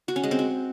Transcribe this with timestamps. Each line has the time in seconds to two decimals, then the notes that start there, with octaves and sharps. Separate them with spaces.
0.08 F#4
0.16 C#4
0.24 G#3
0.31 C4
0.39 F#4